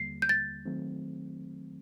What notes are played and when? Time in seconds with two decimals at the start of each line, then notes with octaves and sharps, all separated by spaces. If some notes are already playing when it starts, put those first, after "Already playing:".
Already playing: D#2 D3 G3 A#3 C7
0.22 G6
0.29 A6
0.66 D#3 F#3 A3 C4